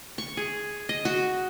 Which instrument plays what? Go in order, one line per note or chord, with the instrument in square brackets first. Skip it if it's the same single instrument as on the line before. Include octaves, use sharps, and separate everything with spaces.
[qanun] C#6
G#4
D#5
F#4